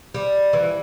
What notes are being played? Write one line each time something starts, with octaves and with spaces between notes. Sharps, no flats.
G3
E3